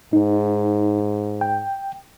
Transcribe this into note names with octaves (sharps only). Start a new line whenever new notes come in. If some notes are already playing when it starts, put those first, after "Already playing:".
G#2 D#4
G5